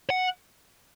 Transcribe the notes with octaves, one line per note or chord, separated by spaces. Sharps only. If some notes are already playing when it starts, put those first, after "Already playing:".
F#5